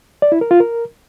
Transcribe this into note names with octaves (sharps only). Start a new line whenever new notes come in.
D5
E4
A#4
F4
A#4